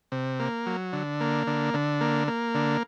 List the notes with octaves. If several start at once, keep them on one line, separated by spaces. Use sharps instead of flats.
C3
A#3
F#3
D3
A#3
D3
D3
A#3
A#3
D3